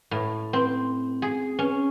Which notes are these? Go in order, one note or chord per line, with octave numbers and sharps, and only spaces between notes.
A2
C4
G#4
C#4